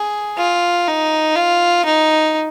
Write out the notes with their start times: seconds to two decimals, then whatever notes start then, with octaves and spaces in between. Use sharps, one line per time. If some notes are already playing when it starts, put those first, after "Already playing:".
Already playing: G#4
0.38 F4
0.88 D#4
1.36 F4
1.85 D#4